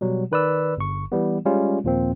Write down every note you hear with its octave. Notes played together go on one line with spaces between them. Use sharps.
B2 F#3 G3
D#3 B4 D5 E6
G1 C#6
E3 G3 B3
G3 G#3 C#4 F4
D#2 A#2 F3 A#3 C4